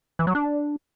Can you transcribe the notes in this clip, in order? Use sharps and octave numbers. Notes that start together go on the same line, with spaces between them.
E3
F#3
D4